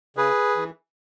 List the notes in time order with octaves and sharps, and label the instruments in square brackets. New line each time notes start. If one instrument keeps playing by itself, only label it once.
[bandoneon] C#3 G#4 B4
E3